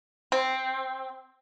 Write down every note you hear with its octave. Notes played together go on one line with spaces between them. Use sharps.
C4